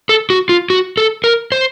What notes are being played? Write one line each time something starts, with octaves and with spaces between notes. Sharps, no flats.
A4
F#4
F4
F#4
A4
A#4
C5